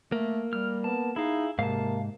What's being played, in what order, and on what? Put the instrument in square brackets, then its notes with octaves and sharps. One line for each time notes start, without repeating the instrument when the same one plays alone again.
[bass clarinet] A3 [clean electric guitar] A#3
[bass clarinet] G3 [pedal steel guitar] F6
[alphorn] B3 [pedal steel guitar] A5
[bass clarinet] D#4 [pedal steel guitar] E4 F5 [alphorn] G#4
[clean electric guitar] G#2 [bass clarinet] C3 [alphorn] A#3 [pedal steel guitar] F5 A5